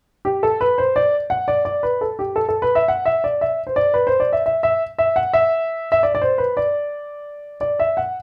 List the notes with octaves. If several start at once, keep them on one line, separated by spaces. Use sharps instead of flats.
G4
A4
B4
C5
D5
F#5
D5
D5
B4
A4
G4
A4
A4
B4
E5
F#5
E5
D5
E5
C5
D5
B4
C5
D5
E5
E5
E5
E5
F#5
E5
E5
D5
D5
C5
B4
D5
D5
E5
F#5